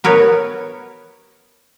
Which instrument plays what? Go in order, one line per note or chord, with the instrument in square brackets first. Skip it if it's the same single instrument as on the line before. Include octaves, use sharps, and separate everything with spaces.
[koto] B3 A#4 B4 C#5